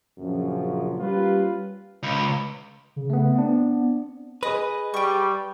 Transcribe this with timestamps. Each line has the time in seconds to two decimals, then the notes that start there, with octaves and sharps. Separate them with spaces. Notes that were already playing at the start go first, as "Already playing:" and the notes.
0.18 A#1 F#2 C#3 F3
0.99 G3 A#3 C#4 F4 G4 B4
2.03 C#2
2.96 C#3
3.10 A3 B3
3.35 B3 C4 D4
4.43 G#4 B4 D#5
4.94 G3 G5 C#6